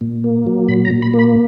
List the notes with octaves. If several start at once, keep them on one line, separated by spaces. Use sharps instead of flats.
A#2
A#3
F#3
A#2 B5
A#5
A#2
B5
A#3
B5